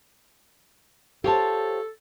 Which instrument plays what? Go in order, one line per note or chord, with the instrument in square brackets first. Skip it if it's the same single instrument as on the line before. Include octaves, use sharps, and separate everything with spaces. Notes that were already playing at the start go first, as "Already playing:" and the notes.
[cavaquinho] F4 C#5 A5 [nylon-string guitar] G4 C5 [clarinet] A4